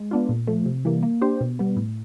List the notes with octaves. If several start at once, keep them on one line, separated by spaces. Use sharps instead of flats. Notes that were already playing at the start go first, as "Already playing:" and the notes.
Already playing: G#3
B3 D4 F4
A#2
F3 A3
C3
E3 G3 A#3
A#3
D4 G4 C5
B2
G3 B3
A2